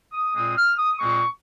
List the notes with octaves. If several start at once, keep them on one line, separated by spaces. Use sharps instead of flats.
D#6
A#2 G#3 C4 D#6
F6
D#6
A#2 G#3 C4 C#6